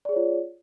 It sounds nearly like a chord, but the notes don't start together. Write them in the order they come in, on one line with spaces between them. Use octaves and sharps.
D5 G#4 C#5 F4